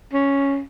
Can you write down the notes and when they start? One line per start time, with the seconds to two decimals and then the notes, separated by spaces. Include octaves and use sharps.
0.13 C#4